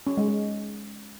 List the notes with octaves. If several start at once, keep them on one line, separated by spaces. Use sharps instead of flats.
C#4
G#3
G#3